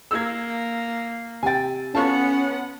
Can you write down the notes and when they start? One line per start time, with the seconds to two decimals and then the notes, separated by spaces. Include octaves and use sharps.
0.11 A#3 E6 G#6
1.43 C3 G5 G#5 A6
1.95 B3 C#4 F4 A4 F#5 A5 C#6